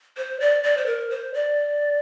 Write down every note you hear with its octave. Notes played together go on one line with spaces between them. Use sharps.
C5
D5
D5
C5
A#4
C5
D5